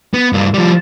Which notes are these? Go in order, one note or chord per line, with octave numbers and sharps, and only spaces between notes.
B3
G2 A#3
F3 G3